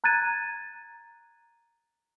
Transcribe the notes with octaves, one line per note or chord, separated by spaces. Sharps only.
A#5 F#6 G#6 A6 D#7